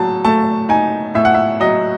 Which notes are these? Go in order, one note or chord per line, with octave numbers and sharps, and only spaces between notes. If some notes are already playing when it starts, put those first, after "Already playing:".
Already playing: A2 F#3 A5
A3 A5
D#4 G#5
A2 E5
F#5
E5
F#3 D#5